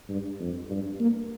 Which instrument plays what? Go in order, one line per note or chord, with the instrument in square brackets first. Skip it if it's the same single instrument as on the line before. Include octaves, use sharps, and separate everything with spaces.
[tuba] G2
F2
G2
A#3